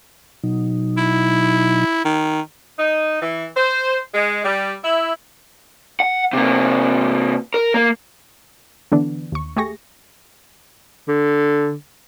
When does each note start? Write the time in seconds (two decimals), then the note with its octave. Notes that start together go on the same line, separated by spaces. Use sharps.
0.44 B2 F#3 D#4
0.98 E4
2.05 D#3
2.79 D#4
3.22 E3
3.57 C5
4.14 G#3
4.44 G3
4.84 E4
6.00 F#5
6.33 C3 A#3
7.54 A#4
7.74 A#3
8.92 D3 E3 B3 D4
9.32 D#2 C#6
9.56 A3 G4 G#4 C#6 A#6
11.08 D3